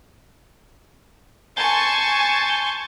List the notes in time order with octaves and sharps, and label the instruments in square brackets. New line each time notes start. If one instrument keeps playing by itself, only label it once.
[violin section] G#5 A5 C#6 [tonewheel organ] C6 G6 A6